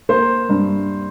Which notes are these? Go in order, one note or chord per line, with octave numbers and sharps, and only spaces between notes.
A#3 C5
G2